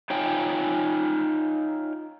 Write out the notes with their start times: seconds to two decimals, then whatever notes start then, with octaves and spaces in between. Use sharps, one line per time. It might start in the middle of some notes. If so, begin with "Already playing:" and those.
0.10 D#4 F4 C#5 G5 G#5